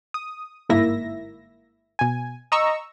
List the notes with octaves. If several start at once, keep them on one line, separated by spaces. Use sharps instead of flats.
D#6
G1 G#2 A#3 E4 E5 A#6
B2 G#5
D#5 A#5 C#6 E6